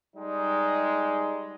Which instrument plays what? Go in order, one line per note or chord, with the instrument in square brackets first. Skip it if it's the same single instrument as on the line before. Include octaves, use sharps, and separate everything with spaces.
[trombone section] G3 G#3 D#4